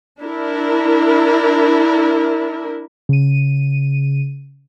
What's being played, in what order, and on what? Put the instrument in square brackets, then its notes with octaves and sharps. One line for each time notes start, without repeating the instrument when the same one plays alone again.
[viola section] D4 E4 A#4
[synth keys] C#3 D#7